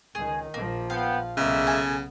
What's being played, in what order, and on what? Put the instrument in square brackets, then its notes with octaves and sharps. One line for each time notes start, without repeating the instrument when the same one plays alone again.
[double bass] C#2 D#3 [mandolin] G#4
[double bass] A#1 F3 [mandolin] A#3
[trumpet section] B3 G5 [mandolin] F5
[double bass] B1 B3 [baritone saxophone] C#3 [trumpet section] G#3 A#3 E5
[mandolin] A4 G#5